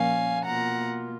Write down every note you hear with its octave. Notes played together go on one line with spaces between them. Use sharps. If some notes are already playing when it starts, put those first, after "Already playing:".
Already playing: A#2 F3 A#3 C#4 F5 G#5
B2 A#3 F4 F#5 A#5